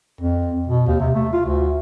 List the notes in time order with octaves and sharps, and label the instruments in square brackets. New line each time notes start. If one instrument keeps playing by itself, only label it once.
[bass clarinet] F2
B2
D#2
C3
A3
F4
D2